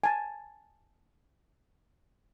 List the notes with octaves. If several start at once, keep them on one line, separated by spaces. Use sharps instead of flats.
G#5 A5